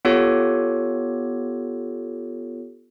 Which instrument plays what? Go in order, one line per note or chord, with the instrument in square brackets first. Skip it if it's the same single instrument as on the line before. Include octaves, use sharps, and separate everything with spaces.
[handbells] B3 F4 G4 A4 C#5